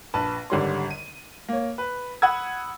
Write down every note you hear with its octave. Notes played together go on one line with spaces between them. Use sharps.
A#1 B4 A5
G#1 D3 G3 C#5 C6
D#7
A#3 C#5
B4
F#5 B5 D#6 E6 G#6